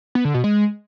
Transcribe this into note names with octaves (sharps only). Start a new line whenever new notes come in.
B3
D3
B2
G#3